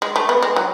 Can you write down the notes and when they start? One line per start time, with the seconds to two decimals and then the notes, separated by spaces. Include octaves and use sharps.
0.02 G#3
0.16 A3
0.29 B3
0.42 G#3
0.56 F#3